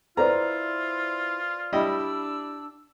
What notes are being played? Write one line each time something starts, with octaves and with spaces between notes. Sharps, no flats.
E4 F4 B4 C5 D5 A#5
G3 D4 E4 D#5 E6